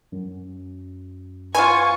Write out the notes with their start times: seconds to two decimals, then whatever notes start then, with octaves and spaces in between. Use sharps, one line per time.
0.12 F#2
1.55 B3 F4 G#5 C#6